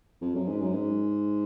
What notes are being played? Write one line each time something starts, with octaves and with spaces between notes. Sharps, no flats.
F2
F#2
G#2
F#2
G#2